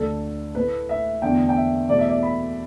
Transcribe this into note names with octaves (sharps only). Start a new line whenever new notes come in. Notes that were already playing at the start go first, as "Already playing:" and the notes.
Already playing: D2 D3 A3 A4
A2 A3 B4
E5
E2 D3 A3 G5
G5
E5
E2 B2 A3 D5
E5
D5
B5